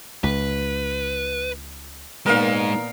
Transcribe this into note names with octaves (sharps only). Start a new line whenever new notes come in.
C#2 B4
A#2 D#3 G#3 B3 D#4 A#4 F5